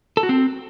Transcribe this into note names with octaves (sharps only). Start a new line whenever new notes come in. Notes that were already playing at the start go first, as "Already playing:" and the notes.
A4
F#4
C4